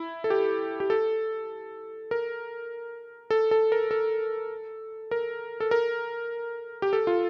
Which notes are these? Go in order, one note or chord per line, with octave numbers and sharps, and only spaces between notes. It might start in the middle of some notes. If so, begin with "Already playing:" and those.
Already playing: E4
A4
G4
G4
A4
A#4
A4
A4
A#4
A4
A#4
A4
A#4
G4
A4
F4